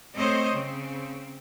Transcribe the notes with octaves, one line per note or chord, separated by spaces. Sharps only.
A3 C4 C5 C#5 D#5
C#3 C4